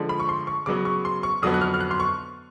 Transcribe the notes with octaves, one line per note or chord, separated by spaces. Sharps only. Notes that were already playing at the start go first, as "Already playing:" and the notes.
Already playing: D3 F3 G#3
B5
C#6
C6
C#6
C#3 F#3 B3 D6
C#6
C6
C#6
F2 D3 F#3 B3 D#6
F#6
F6
F6
F#6
C6
C#6